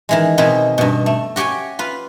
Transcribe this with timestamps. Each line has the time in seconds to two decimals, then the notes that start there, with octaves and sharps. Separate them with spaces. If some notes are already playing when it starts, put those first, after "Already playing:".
0.09 D#3 E3 G#3
0.38 B2 D#3 C4 G#4 B4
0.78 G2 B2
1.06 A3
1.36 F#4 G4 C#5 G5 G#5
1.79 F4 B4